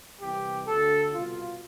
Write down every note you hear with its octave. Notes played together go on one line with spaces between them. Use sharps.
C2 C3 E3 G4
D2 D3 A4
C2 B2 F4